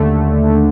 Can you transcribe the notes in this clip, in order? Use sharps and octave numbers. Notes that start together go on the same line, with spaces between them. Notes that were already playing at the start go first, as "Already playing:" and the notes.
Already playing: D#2 D3 A3